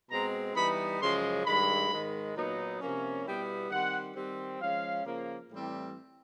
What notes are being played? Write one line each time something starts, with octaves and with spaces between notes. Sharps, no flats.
B2 G#3 C4 A#5
E3 G3 B3 D#4 B5
F#2 C#3 F3 G#3 C6
G2 D#3 G#3 B5
G#2 D#3 G#3
A#2 F#3 B3 D#4
C3 F3 A#3 C#4
B2 G3 B3 E4 G5
D#3 G3 C4 F#5
D#3 G3 C4
F3 G#3 C#4 F5
C#3 F3 A#3
A2 E3 G3 C4